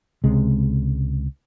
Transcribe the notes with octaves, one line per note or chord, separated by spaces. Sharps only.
C#2 C3 G#3